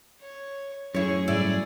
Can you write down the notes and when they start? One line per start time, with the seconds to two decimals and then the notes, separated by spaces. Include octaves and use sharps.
0.20 C#5
0.95 F#2 A2 E4 G#4 C#5 C#6
1.28 G#2 C3 G3 E4 G#4 D5